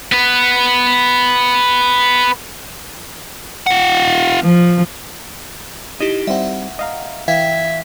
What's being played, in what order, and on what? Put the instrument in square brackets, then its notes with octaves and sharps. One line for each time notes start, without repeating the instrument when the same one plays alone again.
[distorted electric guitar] B3 B4
[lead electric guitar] F4 F#5
[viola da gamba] F3
[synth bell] D#4 E4 G4 [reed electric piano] D#5
[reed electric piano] G3 C4 [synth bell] E5 F#5
[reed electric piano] D#5 F5 A#5
[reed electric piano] E3 [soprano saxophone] E5 [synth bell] F5 G5 G#6